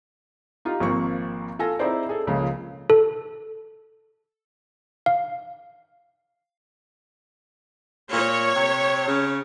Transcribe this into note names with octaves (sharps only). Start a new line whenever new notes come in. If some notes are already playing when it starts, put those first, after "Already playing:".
D#4 F4 G4
G#1 F3 A#3 C4 C#6
F4 A4 G#5 A#6
C4 D#4 E4 G#4 C5 D5
G#4 A4
C#2 C#3 F3 G#3 A#3
A4
F5
A#2 C#5
C3
C#3